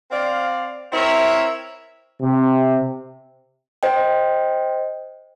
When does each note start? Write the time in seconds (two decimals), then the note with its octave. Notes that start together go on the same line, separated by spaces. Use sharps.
0.11 C4 D5 F5
0.93 C4 E4 A#4 C#5 E5
2.20 C3
3.83 C5 D#5 G5